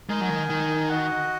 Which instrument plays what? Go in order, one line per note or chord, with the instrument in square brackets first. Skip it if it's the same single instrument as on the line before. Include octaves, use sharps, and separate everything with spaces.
[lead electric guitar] G#3 [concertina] D#4 A#4 D#5 G#5
[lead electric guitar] F#3
D#3
D#3
[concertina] F#4 D#5 F#5